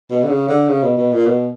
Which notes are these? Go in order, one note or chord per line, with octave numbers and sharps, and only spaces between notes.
B2
D3
C#3
D3
C#3
B2
B2
A#2
B2